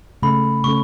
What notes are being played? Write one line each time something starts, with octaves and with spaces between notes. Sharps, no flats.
C#3 A3 C#4 A4 B5
C#3 A3 C#4 A4 C#6